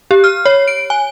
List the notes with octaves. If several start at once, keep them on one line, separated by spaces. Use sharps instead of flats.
G4
F6
C#5
D7
G#5